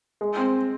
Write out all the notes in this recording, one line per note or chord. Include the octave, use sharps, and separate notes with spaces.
G#3
C4